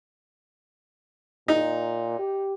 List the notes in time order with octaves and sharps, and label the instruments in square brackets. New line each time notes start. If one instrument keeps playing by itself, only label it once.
[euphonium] A#2 [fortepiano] D#4
[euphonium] G4